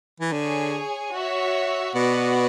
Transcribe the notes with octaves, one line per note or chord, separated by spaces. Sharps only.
E3
D3 G#4 C#5 G#5
F#4 C#5 E5
B2 B3 F#4 B4 D5 F#5